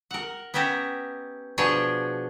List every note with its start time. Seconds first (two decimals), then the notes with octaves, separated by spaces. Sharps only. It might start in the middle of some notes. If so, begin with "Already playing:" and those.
0.11 A#4 F#5
0.54 B3 C#4 G4 E5 A#5
1.58 B2 F3 D4 G#4 C#5